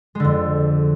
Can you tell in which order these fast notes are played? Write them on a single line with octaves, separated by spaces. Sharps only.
G#3 D3 F2